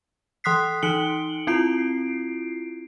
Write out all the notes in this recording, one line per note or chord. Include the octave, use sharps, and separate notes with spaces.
E3 C6 D#6 F#6 B6 C7
E3 D#4 C#7 D7 F#7 G7
C4 E4 F4 C7 D7